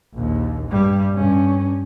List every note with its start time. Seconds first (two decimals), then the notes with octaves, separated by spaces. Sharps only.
0.14 A#1 D#2
0.68 G2 G3
1.16 G2 C#4